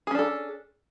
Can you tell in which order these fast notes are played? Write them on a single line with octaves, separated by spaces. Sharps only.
G#4 C#4 D4 A4